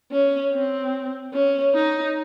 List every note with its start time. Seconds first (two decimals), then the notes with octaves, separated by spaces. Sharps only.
0.11 C#4
0.52 C4
1.33 C#4
1.74 D#4